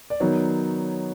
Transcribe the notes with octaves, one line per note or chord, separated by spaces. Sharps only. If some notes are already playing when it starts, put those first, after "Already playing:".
D5
D#3 F#3 B3 D#4 C#5